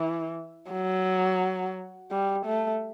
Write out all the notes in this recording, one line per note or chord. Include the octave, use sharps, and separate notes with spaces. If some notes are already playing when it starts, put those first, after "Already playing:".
Already playing: E3
F#3
G3
A3